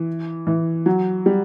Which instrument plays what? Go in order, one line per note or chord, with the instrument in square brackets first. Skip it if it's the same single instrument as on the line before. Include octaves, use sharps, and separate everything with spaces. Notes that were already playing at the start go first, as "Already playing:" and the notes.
Already playing: [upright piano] E3
E3
F#3
G3